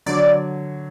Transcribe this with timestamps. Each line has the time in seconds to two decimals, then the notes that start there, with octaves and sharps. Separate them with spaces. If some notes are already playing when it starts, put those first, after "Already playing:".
0.06 D3 F#3 D5